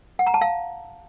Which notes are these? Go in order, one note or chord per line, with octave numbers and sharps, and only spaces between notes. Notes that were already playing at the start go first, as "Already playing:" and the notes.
F#5
A#5
A5
F5